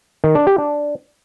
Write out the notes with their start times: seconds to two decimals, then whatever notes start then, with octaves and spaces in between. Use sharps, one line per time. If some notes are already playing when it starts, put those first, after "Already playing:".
0.24 D#3
0.35 D4
0.47 G4
0.58 D4